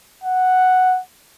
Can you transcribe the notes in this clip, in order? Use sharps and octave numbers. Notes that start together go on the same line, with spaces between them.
F#5